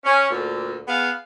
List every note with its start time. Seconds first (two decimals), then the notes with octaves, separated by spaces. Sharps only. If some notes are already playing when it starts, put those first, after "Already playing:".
0.04 C#4
0.30 D2 A#2 D3
0.87 B3 G#4 F5